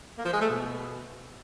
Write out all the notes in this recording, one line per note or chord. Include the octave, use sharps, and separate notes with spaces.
A#3
F3
G#3
A3
B2